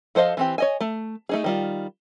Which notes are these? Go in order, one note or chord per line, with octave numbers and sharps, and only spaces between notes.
F3 A4 C5 D#5 F5
E3 C4 G4
C#5 D#5 G#5
A3
A3 D#4 G#4
D#3 G3 F4